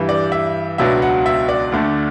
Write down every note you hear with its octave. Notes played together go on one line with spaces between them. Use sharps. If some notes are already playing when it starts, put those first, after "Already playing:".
Already playing: G2 E3 G3
D5
E5
C#2 B2 F#3 B3 D4 E5
F#5
E5
D5
D2 D3 A3